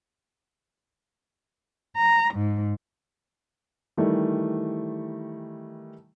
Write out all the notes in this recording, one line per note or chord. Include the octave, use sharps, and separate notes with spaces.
A#5
G#2
D#3 E3 G3 A3